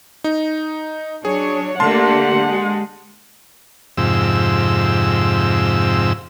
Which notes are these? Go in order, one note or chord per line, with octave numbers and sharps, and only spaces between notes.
D#4
F#3 D4 G#4 C#5
D3 A3 A#3 G4 F#5 A5 C6
G#3
F2 G#2 C3 E6